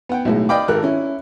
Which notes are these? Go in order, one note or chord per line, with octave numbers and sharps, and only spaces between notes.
B3 F#5 G5
B1 A2 G#3
D5 D#5 F5 G5 B5 D6
G#1 A4 A#4 F#6
C#4 E4